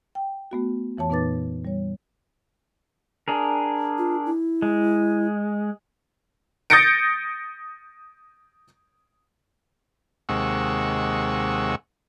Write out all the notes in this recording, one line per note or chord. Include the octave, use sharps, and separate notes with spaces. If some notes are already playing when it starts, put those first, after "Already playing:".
G5
A3 B3 F#4
F2 E3 C#5 A5
A#2 B3 D#4 B4 D6 A6
G3 C#5
D4 G#4 A#4
F4
E4
G#3
D#6 G6 A6 A#6 C#7 D7
D#2 C3 G#3 F#5 C#6 E6